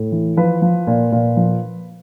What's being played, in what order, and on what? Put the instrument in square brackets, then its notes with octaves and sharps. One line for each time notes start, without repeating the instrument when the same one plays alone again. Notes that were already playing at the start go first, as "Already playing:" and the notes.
Already playing: [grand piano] A2
E3
F3 B4
F3
A#2
A#2
F3